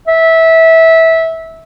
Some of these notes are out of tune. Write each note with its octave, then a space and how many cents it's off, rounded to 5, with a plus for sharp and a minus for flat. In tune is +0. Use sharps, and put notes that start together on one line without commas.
E5 -20